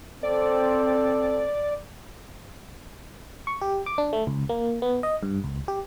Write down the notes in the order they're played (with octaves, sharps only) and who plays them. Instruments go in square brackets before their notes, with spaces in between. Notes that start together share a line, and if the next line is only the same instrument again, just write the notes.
[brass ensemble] C4 A4 [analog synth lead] D5
[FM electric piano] C#6
G4
D6
D4
A3
C#2
A#3
B3
D#5
G2
C#2
G4